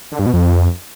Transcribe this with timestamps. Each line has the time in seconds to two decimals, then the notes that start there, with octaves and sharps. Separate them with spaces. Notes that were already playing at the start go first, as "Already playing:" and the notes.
0.12 D3
0.19 G2
0.26 B2
0.33 F2